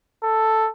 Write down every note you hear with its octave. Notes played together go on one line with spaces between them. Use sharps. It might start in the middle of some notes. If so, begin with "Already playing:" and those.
A4